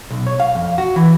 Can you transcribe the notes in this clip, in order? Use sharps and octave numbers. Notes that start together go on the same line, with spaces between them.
B1
C#5
F5
F2
F#4
E3